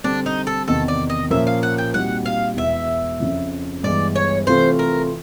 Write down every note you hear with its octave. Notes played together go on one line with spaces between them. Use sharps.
D3 G3 C4 D4
D#4
A4
E2 C3 D#3 A4
D5
D#5
A#2 F3 A#3 C#4 E5
F5
F#5
G5
A#2 G3 C4 D#4 F#4 F#5
F5
E2 B2 G#3 B3 E5
F2 C#3 F3
G2 E3 G#3 B3 D5
C#5
C3 E3 A3 C4 F4 C5
A#4